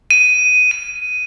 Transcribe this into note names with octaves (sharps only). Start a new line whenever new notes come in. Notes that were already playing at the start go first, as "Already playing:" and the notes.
D#7
D#7